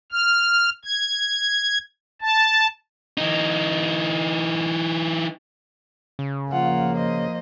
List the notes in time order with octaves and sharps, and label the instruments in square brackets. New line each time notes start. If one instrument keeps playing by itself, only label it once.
[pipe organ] F6
G#6
A5
[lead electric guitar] E3 D#4
[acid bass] C#3
[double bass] F3 A#3 [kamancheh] F4 F#5
[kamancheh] C5 D#5